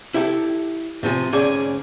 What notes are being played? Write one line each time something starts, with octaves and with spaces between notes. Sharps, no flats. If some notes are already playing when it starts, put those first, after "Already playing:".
E4 G4 A4
A2 C3 F3 G#5
D2 G#2 C#4 G#4 D5 G#5